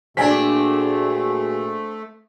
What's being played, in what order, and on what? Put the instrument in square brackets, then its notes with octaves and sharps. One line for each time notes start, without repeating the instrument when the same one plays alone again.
[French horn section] A#2 F#4 G#4 [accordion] A3 [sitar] C4 D4 [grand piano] G#5 B6